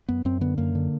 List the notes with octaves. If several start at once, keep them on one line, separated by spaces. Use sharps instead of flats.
F#2 B3
F#2 C4
D3 B3
F#2 A#3
D3